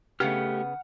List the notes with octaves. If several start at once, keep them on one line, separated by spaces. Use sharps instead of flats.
C#3 A3 B3 G4 F#5 F6